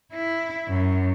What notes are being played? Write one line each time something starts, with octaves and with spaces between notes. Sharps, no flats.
E4
F#2